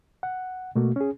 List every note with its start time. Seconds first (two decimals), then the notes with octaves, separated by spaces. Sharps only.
0.23 F#5
0.75 B2 A3 A#3 F#4
0.96 C#4 G#4